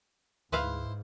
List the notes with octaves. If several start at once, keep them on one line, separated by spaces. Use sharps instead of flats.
D2 G#2 E4 B4 C5 E5 F5